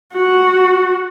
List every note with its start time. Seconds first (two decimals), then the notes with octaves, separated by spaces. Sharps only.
0.13 F#4